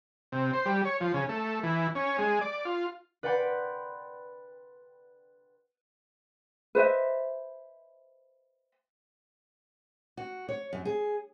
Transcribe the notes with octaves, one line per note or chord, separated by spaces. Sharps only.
C3
C5
G3
C#5
F3
C#3
A3
E3
C#4
G#3
D5
F4
B4 D5 F#5 G5 B5 C6
B4 C5 D#5 E5
F#4
C#5
F#2
G#4